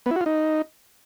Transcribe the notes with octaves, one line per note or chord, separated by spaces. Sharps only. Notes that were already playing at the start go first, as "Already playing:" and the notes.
B3
E4
F#4
F4
D#4